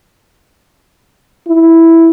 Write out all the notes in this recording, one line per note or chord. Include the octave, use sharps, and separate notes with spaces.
E4